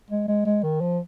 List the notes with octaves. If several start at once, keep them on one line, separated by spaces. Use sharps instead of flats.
G#3
G#3
G#3
D#3
F3